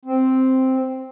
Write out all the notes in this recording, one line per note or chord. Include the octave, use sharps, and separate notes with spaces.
C4